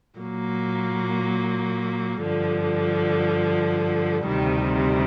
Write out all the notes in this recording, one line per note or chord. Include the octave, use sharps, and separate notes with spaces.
A#2 F#3 A#3
G2 D3 F3
D2 C3 D#3 G3